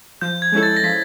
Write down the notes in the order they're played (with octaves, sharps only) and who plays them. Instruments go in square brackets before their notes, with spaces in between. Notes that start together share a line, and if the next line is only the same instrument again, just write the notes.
[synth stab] F3 [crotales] G6
[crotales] G#6
[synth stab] G#3 C#4 E4 A4
[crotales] A6
A#6
[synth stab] F3 [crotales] B6